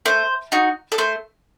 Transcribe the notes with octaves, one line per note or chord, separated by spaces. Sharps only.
A3 C5
D#4 F#4
A4
A3 C5